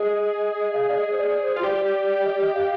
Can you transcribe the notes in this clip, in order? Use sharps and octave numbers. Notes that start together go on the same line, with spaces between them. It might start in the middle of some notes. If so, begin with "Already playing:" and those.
Already playing: G#4 D#5
F5
D5
D#5
C5
D5
C5
F4 C5
G4 D5
D5
D#5
D5
D#5
F5